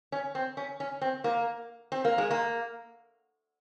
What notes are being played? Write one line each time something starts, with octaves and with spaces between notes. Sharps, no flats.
C#4
C4
C#4
C#4
C4
A#3
C4
A#3
G#3
A#3